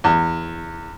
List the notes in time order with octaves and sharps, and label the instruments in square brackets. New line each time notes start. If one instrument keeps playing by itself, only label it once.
[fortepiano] E2